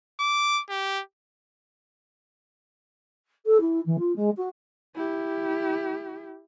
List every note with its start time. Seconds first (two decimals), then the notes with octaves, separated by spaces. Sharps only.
0.20 D6
0.69 G4
3.46 A4
3.60 E4
3.86 E3
3.98 F4
4.15 G#3
4.36 F#4
4.95 E4 G4